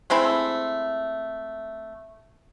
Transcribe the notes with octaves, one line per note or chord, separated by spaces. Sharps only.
G#3 A3 C4 E4